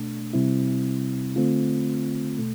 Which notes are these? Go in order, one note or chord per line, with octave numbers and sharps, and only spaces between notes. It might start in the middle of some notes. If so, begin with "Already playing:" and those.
Already playing: B2 A3 D4
C3 G3 C4 E4
D3 A3 C4 F4
B2 A3